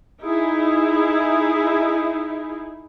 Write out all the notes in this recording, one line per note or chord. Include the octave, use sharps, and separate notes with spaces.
D#4 E4 G#4